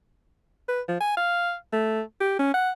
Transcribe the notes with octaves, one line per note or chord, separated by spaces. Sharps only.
B4
F3
G#5
F5
A3
G4
C#4
F#5